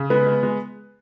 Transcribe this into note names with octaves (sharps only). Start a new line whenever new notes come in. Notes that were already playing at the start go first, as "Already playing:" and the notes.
Already playing: C#3
G#3 B3 B4
G#3
G#3